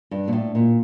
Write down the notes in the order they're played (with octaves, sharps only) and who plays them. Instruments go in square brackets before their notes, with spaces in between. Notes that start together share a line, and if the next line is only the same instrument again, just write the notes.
[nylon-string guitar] G2
A#2
A2
A#2